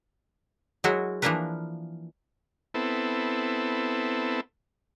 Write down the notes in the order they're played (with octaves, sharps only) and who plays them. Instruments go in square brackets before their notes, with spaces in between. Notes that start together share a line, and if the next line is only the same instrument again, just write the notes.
[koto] F#3 G#3 E4 F#4 A#4
E3 F3 A#3 D4 A#4 B4
[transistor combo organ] B3 C4 E4 A4